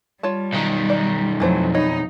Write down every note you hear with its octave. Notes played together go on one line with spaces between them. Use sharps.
G3 F4 C#5 A5
B1 D#3
D5
F2 E3 F#3 A3 C5
D#4 C#5 D#5 B5